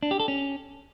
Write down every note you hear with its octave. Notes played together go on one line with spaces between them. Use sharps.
D4
G4
A4
C#4